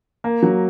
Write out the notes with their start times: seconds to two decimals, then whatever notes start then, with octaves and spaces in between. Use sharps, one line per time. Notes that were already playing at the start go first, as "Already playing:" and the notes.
0.24 A#3
0.43 F#3